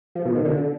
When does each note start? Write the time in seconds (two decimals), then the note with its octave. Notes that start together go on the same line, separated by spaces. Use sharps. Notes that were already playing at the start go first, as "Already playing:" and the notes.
0.15 F3
0.25 B2
0.35 D#3
0.45 D3